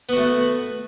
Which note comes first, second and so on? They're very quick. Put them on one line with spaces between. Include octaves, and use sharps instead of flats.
B3 F#4 A3